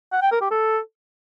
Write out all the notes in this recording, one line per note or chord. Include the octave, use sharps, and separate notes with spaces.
F#5
G5
A#4
G4
A4